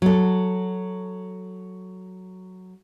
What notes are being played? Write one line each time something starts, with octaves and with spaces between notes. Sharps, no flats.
F#3 A4